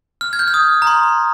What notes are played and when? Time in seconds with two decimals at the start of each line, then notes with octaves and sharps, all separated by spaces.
0.21 F6
0.33 G#6
0.39 G6
0.48 F6
0.54 D#6
0.82 A#5
0.87 C6